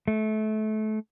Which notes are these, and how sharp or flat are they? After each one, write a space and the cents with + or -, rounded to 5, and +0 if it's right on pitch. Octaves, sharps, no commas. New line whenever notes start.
A3 -25